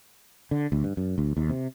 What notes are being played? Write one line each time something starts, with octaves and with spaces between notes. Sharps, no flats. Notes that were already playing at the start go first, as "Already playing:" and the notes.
D3
D2
G2
F#2
D2
D#2
C3